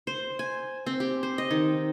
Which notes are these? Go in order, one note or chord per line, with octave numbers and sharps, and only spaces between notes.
C5
G#5
C4
G4
C5
D#5
D#3